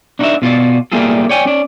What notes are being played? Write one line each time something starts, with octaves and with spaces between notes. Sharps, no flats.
D4 D#4 F#4 G4 A#4 E5
B2 F4 F#4 D5
G3 A3 A#3 F4 G#4 A4
C#5 D5 G5 G#5
C#4 D5